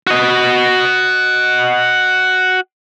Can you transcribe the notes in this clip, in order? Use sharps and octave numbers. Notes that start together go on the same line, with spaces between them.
F#4 D#5